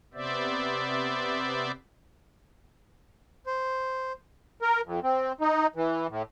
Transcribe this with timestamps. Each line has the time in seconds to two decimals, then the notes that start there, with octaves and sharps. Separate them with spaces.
0.14 C3 B3 C5 D5 E5
3.46 C5
4.62 A#4
4.85 F2
5.03 C4
5.41 D#4
5.76 E3
6.10 A2